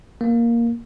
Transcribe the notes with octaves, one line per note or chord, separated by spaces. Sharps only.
A#3